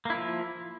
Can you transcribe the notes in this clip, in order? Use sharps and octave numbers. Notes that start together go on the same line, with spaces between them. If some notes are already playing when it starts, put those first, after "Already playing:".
F3 A#3 E4